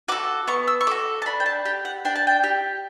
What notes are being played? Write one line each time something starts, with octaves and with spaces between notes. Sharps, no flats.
F#4 A4 D6
B3 C#6
E6
C#6
F#4 A4 D6
A5
D4 B5
G5
A5
G4 G5
F#5
D4 G5
A5
G5
G4